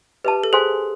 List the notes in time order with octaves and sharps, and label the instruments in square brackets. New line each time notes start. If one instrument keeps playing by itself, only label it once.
[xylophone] G4 [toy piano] B4 E5 A5
[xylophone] A4
[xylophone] G#4 [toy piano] C5 F5 G#5 C6